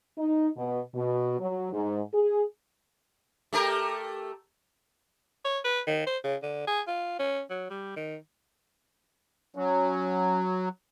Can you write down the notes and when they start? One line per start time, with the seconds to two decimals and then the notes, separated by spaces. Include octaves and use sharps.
0.18 D#4
0.57 B2
0.94 B2
1.40 F#3
1.72 G#2
2.13 G#4
3.53 A3 G4 A#4
5.45 C#5
5.64 B4
5.87 D#3
6.07 C5
6.24 C#3
6.43 D3
6.67 G#4
6.87 F4
7.19 C#4
7.50 F#3
7.70 G3
7.96 D#3
9.56 F#3 C#4